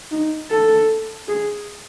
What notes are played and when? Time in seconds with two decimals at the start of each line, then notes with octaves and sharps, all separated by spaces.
0.11 D#4
0.50 A4
1.28 G#4